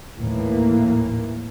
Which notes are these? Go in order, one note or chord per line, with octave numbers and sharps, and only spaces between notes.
D#2 A2 E3 A#3